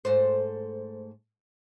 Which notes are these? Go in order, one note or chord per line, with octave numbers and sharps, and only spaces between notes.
G#2 A3 C5